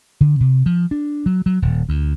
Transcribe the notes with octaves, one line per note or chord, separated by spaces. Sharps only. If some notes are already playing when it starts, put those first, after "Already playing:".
D3
C3
F3
D4
F#3
F#3
D#1
D2